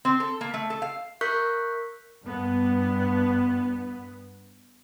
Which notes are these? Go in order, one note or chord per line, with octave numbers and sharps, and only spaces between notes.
C4
A4
A#3
A3
A4
F5
A#4 E5 C#6 F#6 G6 B6
G2 B3